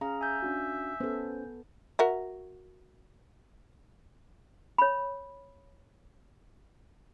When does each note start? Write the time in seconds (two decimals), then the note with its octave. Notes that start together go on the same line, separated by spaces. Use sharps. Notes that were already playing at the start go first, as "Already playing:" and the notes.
0.01 C#4 G#4 F5 A#5
0.21 E5 G#5 G6
0.42 C#4 D4 F#4
1.00 B3 C#4 A4 C5
1.99 F#4 A#4 E5
4.78 C#5 B5